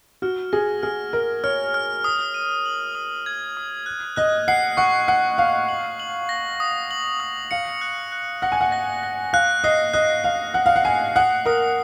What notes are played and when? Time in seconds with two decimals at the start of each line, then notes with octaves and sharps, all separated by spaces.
0.22 F#4 F6
0.53 G#4 A#6
0.83 G#4 F6
1.13 A#4 F6
1.44 C#5 F6
1.74 F6
2.04 D#6
2.34 D#7
2.66 F#7
2.95 D#6
3.26 G#6
3.57 D#6
3.86 F#6
4.16 D#5 F#6
4.48 F#5 C7
4.77 F#5 C#6
5.08 F#5 C7
5.38 F5 C7
5.69 F#7
6.00 F#7
6.29 A#6
6.60 D#6
6.91 F#7
7.20 D#6
7.51 F5 C#7
7.81 F#6
8.12 F#6
8.42 F#5 A#6
8.52 G#5
8.61 F#5
8.72 A#6
9.03 A#6
9.33 F5 F#6
9.64 D#5 C7
9.93 D#5 F#6
10.24 F5 C7
10.54 F#5 F#6
10.66 F5
10.76 F#5
10.85 G#5 C7
11.16 F#5 D#6
11.46 A#4 D#6